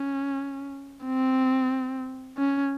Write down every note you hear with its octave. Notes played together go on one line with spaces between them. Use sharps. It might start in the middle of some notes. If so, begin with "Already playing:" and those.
Already playing: C#4
C4
C#4